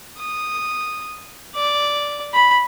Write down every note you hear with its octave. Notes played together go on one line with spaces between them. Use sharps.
D#6
D5
B5